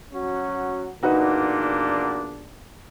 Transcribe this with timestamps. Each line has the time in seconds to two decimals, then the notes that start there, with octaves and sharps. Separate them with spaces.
0.13 F#3 C#4 F#4
1.03 E2 A#2 D4 D#4 F#4 B4